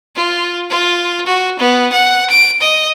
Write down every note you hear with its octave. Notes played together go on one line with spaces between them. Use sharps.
F4
F4
F#4
B3
F#5
D7
D#5